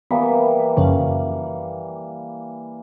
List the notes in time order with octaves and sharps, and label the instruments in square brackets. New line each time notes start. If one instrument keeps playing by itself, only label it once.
[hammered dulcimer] E3 G3 A#3 [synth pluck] B3
[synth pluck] F#2 C#3 F3